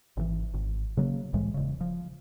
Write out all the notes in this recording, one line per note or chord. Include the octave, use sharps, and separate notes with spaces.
G#1 D3 E3
G#1
C#3 F#3 A#3
C2 A2 E3 G#3
E1 C#3
F3